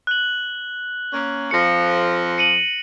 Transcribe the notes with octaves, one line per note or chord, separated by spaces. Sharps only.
F#6 F#7
A#3 C#4
F2 F3 A#6 C#7
C#7 D#7 F#7